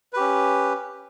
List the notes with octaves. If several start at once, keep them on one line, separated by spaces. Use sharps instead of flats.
C#4 G4 B4